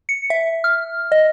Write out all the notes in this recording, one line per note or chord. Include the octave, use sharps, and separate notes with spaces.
C#7
E5
F6
D#5